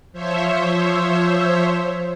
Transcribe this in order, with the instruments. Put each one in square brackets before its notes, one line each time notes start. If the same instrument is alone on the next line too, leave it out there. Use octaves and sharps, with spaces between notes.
[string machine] F3 C5 C#5 E5